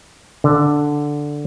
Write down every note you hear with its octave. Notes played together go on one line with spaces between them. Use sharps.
D3